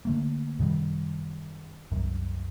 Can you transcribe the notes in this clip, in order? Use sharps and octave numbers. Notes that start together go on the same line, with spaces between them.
D3 A3 A#3
F#2 C3 D#3 G3
C2 F#2